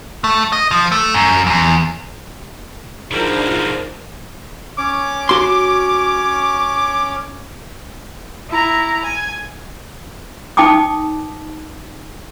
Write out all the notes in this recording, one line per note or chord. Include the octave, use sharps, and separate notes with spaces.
A3
D#5
F3
A3
F#2
E2
G#2 B2 F3 C4 D4 E4 A#4
C#4 C#5 D6
F#4 C6
E4 A#5
G#5
D#4 G5 A5 D6 D#6